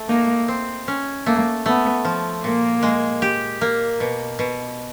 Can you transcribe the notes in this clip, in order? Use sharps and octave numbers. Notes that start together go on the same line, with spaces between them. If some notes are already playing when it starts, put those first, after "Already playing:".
Already playing: A3
A#3 D#4
C4
C#4
A3 A#3
A3 B3
F3
A#2 A#3
G#3
G4
A#3
B2
B2